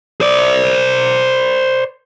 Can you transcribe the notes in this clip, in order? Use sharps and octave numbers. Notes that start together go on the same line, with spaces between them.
C5 D5